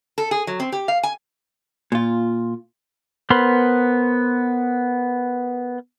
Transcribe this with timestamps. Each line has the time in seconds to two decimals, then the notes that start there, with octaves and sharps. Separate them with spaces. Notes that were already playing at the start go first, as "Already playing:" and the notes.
0.18 A4
0.31 G#4
0.47 F#3
0.60 C4
0.72 G4
0.88 F5
1.03 G#5
1.92 A#2 F4
3.30 B3 A#4 C5 B5 C6